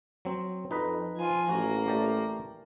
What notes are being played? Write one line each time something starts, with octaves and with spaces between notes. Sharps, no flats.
F#3 C4
F2 D#4 B4 D#5
F3 F4 G#5
A1 A#3 F#4
A3 G4 D5